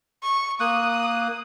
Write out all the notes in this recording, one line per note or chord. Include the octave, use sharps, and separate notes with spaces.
C#6
A#3 D#6 F#6